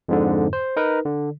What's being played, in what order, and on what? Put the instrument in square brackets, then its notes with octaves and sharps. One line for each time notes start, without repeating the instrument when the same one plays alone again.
[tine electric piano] F2 G#2 D3
C5
D#4 A#4 B4
D3